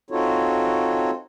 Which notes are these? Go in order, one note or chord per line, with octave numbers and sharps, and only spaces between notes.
C4 D#4 F4 F#4 A4 C#5